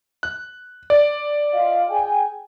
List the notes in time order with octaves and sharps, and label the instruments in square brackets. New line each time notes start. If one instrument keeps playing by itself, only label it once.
[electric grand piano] F#6
D5
[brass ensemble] F4 D#5 F5
G#4 G5 G#5